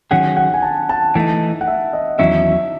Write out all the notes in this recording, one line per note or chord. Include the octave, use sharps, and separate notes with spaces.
D#3 F#3 C#4 G#4 F#5
F#5
G#5
A5
A5
E3 A3 D#4 A5
F#5
E5
D#5
E2 D#3 F#3 C#4 E4 E5